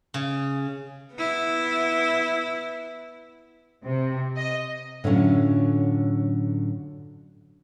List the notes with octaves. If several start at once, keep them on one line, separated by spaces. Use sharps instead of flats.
C#3
B3 E4
C3
D#5
A2 D3 F#3 C#4 F4